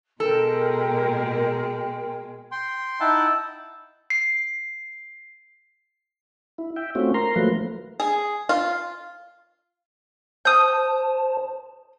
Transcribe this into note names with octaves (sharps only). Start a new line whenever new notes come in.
B2 G#3 A4 A#4 G5
G5 C6
D#4 E4 E5 F#5 G5 A5
C7
E4
E5 G5
A3 C4 C#4 F4 F#4
A#4 A#5 C6
F3 F#3 A3 A#3 B4
G#4
F4
C5 A5 D#6 G6